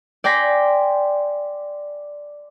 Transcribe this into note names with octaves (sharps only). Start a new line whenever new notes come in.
D5 G5 G#5 C6 A#6 B6